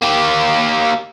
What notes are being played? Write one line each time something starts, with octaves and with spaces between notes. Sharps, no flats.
A#3 G4